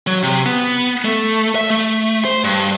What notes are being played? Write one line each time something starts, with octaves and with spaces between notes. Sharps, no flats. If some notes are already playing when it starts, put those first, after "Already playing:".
F#3
C3
B3
A3
E5
A3
C5
G2